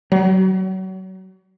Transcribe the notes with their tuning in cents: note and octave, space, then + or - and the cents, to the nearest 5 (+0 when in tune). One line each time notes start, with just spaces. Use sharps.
F#3 +30